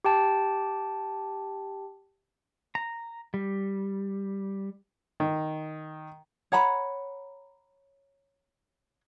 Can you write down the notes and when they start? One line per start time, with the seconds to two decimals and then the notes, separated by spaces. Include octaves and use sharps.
0.05 G4 G5 A5
2.75 A#5
3.34 G3
5.20 D#3
6.52 C#5 F#5 A#5 B5